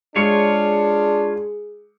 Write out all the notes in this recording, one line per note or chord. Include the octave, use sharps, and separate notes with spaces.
G#3 D4 F4 G#4 C#5 C#7